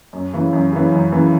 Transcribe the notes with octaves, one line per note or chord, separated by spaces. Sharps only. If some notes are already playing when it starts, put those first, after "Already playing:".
F#2
C#3 E3
F#2
C#3 E3
F#2
C#3 E3